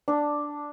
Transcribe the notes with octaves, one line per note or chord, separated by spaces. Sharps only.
D4